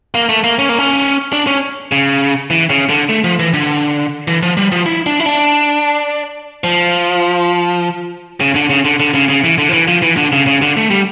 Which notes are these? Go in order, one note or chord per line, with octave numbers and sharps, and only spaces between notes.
A#3
A3
A#3
C#4
A#3
C#4
D4
C#4
C#3
E3
C#3
D3
A3
F3
E3
D3
E3
F3
G3
F3
E4
D4
E4
D4
F3
C#3
D3
C#3
D3
D3
C#3
C#3
E3
D3
F3
E3
F3
E3
D3
C#3
C#3
D3
A3
G3